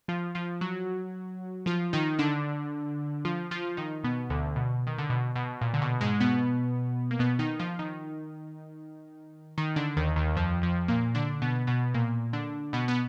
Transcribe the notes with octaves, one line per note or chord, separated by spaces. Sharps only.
F3 F4
F3 F4
F#3 F#4
F3 F4
D#3 D#4
D3 D4
F3 F4
F3 F4
D#3 D#4
B2 B3
D2 D3
B2
D#3
D3
B2
B2
A#2
D3
B2
G#2 G#3
B2 B3
A#3
B2 B3
D#3 D#4
F3 F4
D#3 D#4
D#3 D#4
D3 D4
D#2 D#3
D#2 D#3
F2 F3
F2 F3
A#2 A#3
D3 D4
B2 B3
B2 B3
A#2 A#3
D3 D4
B2 B3
B3